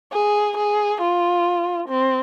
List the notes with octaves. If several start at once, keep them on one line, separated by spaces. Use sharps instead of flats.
G#4
G#4
F4
C4